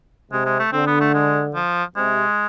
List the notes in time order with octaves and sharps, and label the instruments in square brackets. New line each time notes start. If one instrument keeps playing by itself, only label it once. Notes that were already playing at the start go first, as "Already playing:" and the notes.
[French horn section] C3 [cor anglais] G#3
[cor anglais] G#3
A3
[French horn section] D3 [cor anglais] C4
[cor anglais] B3
A3
G#3
F3
[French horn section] C3 [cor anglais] G#3